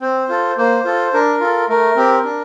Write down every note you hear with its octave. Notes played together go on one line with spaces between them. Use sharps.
C4 C5
F4 A4
A#3 C5
F4 A4
D4 A#4
F4 A4
A3 A#4
C4 G4
D4